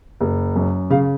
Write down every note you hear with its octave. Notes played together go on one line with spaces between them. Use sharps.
F#1
F#2
C#3 F5